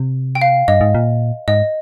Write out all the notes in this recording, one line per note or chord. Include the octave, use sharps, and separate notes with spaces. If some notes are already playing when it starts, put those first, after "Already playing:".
Already playing: C3
G5
F5
G2 D#5
G#2
A#2
G#2 D#5